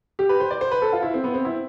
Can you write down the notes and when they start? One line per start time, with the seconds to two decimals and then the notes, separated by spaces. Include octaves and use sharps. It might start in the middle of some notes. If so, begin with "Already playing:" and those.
0.19 G4
0.29 B4
0.40 C5
0.51 D5
0.61 C5
0.71 B4
0.82 A4
0.92 F4
1.03 E4
1.14 C4
1.24 B3
1.34 C4
1.45 E4